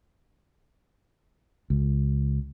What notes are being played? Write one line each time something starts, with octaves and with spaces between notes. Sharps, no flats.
C#2